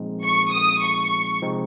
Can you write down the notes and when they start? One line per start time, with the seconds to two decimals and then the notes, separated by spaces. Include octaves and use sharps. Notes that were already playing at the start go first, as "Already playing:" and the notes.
Already playing: A#2 F3 G#3 C4 D#4
0.24 C#6
0.53 D#6
0.82 C#6
1.42 C3 F3 G#3 C4 D#4